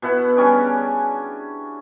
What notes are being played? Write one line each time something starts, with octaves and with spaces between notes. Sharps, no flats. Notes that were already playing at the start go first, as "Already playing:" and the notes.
B2 E4 F#5
G3 C#4 D4 G#4